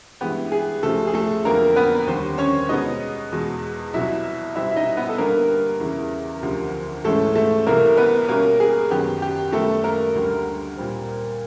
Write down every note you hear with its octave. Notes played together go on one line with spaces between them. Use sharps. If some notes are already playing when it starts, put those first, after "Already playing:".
G2 E3 G#3 B3 G4
G#4
C#2 C3 F3 A3 A4
G#4
A3 A4
F2 D3 F#3 A#3 B3 A#4
B3 B4
D#2 D3 G3 C4 C5
C#4 C#5
B2 G#3 B3 D#4 D#5
E2 B2 G#3
C2 B2 F#3 E4 E5
B2 G3 C4 E4 E5
E5
D#4 D#5
B3 B4
A4
G2 D3 G3 A#3 B3 A#4
E2 C#3 E3
D2 C3 F3
G#2 E3 G#3 A3 C#4 A4
A3 A4
C2 C3 E3 A3 A#3 A#4
B3 B4
B2 G3 A#3 C#4 A#4
G#4
F#2 D#3 F#3 B3 G4
G4
F#2 D#3 G3 A3 B3 A4
A#3 A#4
D2 D3 G3 A#3
A#2 G3 C4